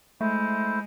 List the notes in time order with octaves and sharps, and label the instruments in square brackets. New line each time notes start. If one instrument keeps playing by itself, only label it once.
[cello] G#3 [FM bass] A3 [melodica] E4 C5